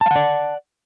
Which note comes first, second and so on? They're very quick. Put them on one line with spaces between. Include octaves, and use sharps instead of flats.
A5 F5 F#5 D5